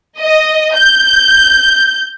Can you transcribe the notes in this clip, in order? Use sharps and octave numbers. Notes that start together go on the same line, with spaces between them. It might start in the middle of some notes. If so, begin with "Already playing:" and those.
D#5
G6